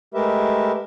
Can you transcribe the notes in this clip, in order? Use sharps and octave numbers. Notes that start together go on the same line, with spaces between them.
G#3 A3 G4 A#4 B4 E5